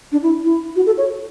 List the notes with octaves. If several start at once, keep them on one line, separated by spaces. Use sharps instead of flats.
D4
E4
E4
F#4
A4
C#5